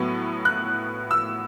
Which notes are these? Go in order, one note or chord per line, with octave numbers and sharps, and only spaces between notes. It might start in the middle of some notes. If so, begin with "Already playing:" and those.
Already playing: A2 F#3 B3
F#6
E6